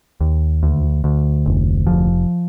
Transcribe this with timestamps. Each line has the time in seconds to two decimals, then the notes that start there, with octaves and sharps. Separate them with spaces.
0.21 D#2
0.63 D2
1.04 D2
1.46 F1
1.87 F3